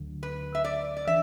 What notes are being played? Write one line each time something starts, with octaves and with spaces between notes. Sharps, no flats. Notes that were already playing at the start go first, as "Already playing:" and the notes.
Already playing: D2 D3 F#3
B4
E5
D5
D5
E3 D4 E5